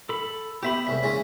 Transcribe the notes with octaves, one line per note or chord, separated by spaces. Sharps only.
A4 B5
B3 G4 E5 B5
C2 G#2 E5
C#3 E3 G#3